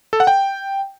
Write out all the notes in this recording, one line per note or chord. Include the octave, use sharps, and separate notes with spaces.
A4
F#5
G5